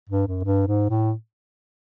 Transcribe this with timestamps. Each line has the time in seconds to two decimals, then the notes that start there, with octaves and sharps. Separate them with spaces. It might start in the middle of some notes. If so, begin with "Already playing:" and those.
0.10 G2
0.27 F#2
0.44 G2
0.67 G#2
0.89 A2